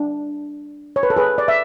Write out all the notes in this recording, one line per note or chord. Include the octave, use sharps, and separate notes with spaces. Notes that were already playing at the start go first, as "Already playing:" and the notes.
Already playing: D4
C#5
B4
A4
G#4 B4
D5
E5